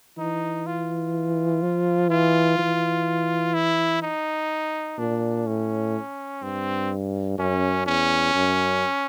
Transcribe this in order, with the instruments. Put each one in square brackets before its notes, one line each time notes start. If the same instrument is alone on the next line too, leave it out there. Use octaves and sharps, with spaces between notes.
[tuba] E3 [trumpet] D#4
[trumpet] F4
[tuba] F3
[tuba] E3 [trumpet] F4
[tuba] E3
[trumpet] E4
D#4
[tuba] A#2 [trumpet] D4
[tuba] A2 [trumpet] C#4
[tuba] G2 [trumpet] C4
[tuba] F#2 [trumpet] C#4
[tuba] E2 [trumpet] C#4
[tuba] F#2